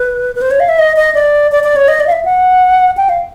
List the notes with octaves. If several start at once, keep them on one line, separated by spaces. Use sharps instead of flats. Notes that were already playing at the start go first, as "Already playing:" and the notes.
Already playing: B4
B4
C5
C#5
F5
E5
D#5
D#5
D5
D5
D5
C#5
D#5
D5
F5
E5
F#5
G5
F5